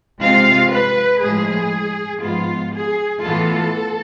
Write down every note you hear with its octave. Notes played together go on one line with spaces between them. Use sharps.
C3 G#3 C4 F4 F5
B4
A2 F3 G#3 G#4
G#2 F3 B3 F4
G#4
A2 E3 B3 F4 A4